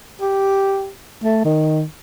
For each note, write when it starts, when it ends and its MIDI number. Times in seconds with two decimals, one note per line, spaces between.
0.21 0.90 67
1.24 1.44 57
1.45 1.83 51